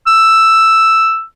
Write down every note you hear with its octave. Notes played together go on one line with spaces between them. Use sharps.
E6